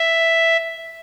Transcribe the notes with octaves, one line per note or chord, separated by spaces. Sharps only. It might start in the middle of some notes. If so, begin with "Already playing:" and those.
Already playing: E5